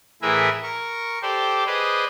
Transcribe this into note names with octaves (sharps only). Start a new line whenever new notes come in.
A2 E3 G#4 A#4 B4 E5
A#4 C#6
G4 A4 C5 D5
G#4 B4 C5 D5 D#5